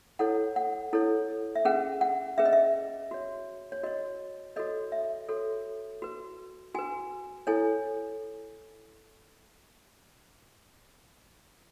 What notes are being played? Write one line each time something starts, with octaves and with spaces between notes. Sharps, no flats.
E4 A4 C#5 F#5
F#5
E4 A4 C#5
E5
C#4 G#4 B4 F#5
F#5
C#4 G#4 B4 E5
D#5
E5
F#4 C#5
C#5
F#4 C#5 D#5
F#4 A4 C#5 D#5
E5
F#4 A4 C#5
F#4 B4
F#4 B4 G#5
E4 A4 C#5 G#5